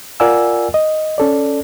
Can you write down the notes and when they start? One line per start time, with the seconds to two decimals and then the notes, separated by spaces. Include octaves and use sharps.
0.20 F4 A#4 D5 F#5 G#5 E6
0.74 D#5
1.18 C#4 A4 D5